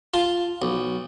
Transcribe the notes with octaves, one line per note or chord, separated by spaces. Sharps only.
F4 A5
B1